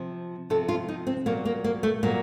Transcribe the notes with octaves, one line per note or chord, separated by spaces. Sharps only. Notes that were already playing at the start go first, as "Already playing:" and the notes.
Already playing: C3 F3
C3 F3 A4
F4
D#4
C4
A#2 F#3 A#3
A#3
A#3
A3
A#2 F#3 A#3